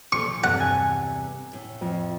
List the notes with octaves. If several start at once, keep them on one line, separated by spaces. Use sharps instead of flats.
A#2 F3 A4 C#6
E2 G2 C3 F#5 A5
G#5
A2
F2